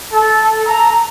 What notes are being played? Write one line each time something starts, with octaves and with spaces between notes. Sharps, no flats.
A4
A#5